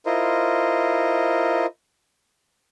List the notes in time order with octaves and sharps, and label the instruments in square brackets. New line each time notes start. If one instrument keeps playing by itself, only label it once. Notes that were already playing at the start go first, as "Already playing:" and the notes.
[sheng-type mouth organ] E4 F4 A#4 C5 D#5